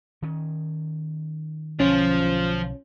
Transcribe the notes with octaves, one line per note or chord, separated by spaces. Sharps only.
D#3 C#4
B1 D3 F3 F#3 C#4 F4